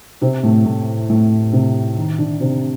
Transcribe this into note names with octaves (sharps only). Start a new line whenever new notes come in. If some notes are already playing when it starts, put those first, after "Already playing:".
C3 C4
A2 A3
A2 A3
A2 A3
C3 C4
D#3 D#4
D3 D4
C3 C4